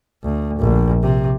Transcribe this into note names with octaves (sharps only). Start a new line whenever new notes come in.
D2
A#1
C3